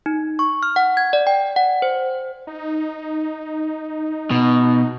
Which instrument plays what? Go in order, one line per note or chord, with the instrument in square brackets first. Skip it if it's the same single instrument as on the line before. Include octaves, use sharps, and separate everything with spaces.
[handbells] D#4
C#6
F6
F#5
G#6
D5
G5
F#5
C5
[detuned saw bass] D#4
[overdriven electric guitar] B2